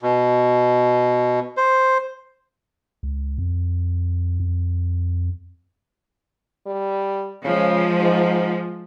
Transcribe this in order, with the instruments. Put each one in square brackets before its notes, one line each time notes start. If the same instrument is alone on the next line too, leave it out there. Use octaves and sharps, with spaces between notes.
[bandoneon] B2
C5
[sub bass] C#2
F2
F2
[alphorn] G3
[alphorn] C#3 [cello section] F3 G#3
[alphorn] G#2